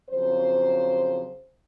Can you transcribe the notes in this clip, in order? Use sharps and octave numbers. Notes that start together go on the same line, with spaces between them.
F2 C#3 F#3 C5